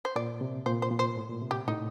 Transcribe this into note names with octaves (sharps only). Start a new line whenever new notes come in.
C5
A#2 D5
C3
A#2 C5
C5
A#2
C5
A2
A#2
C3
G4
A2 D#4